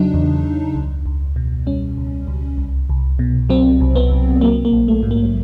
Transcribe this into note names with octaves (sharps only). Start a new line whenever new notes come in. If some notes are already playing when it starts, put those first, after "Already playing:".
Already playing: E2 C#3 F#3 D4 D#4
E2
E2
C#2
C#2
B2
G3 C#4
C#2
C#2
C2
C2
B2
F#3 C4
C2
B3
C2
F#3 A#3
A#3
A#1
A3
G#2
A#3